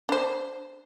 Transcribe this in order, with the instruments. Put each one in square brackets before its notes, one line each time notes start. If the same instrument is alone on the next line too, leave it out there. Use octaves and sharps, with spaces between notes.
[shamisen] D4 C5